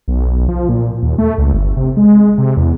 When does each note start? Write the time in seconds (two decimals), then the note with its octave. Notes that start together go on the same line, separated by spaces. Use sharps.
0.08 B1
0.48 F3
0.69 A#2
1.03 D#2
1.18 A3
1.38 C#2
1.53 G1
1.77 C3
1.97 G#3
2.38 C3
2.57 E2